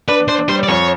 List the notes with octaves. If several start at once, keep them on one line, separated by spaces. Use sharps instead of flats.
D4 B4
D4 C5
G3 C5
D5
F2 C#5